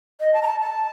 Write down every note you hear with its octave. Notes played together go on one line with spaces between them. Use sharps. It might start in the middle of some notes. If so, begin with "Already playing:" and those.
D#5
A5
A#5
A5
A5